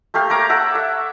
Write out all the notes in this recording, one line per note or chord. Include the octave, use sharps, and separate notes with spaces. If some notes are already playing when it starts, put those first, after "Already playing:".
A3 A#3 G4 F5
A#4 C#5 A#5 D6
A4 E5 F#5
E5